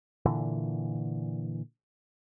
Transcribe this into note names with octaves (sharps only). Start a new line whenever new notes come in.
A#2 D3 E3